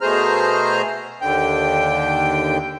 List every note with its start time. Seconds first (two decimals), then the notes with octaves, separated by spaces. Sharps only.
0.01 B2 A3 G#4 C5 A#5 F6
1.21 D#2 D3 G5